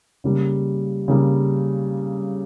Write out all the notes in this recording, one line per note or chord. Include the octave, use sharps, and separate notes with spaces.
C#3 G3 A#3
C#3 G3 A#3